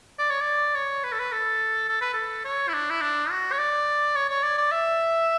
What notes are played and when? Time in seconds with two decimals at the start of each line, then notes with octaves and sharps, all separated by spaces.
0.18 D5
0.30 C#5
0.40 D5
0.75 C#5
1.04 B4
1.12 A4
1.19 B4
1.32 A4
1.88 A4
2.01 B4
2.14 A4
2.45 C#5
2.69 E4
2.74 D4
2.90 E4
3.01 D4
3.31 F#4
3.52 C#5
3.58 D5
4.16 C#5
4.30 C#5
4.43 D5
4.58 D5
4.71 E5